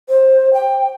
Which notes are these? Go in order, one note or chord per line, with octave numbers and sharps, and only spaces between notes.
C5
G5